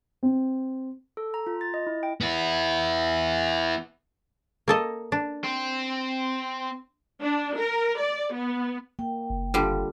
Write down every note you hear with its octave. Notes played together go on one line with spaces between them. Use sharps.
C4
A4
A#5
F4
A6
D#5
E4
G5
B3 E4
A#3 A4 D#5
D4
C4
D4
A#4
D5
B3
A#3 G5
F#1
D3 G3 F4 G4